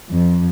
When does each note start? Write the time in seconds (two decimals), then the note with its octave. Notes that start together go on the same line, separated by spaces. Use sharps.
0.12 F2